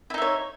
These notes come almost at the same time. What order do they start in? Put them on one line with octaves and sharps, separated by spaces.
E4 D#4 E5 C#5